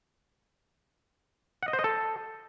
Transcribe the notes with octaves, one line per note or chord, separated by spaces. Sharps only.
F#5
D#5
C5
D#5
A4